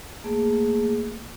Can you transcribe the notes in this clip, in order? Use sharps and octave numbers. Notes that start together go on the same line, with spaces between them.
A3 A#3 G#4